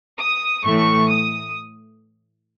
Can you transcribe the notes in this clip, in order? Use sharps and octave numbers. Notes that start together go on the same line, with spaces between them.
D#6
A2 E3 A3 C#6
D#6